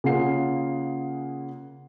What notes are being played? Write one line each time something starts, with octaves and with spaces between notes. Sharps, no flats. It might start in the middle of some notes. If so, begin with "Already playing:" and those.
C#3 A#3 F4 G#4 F#5 C7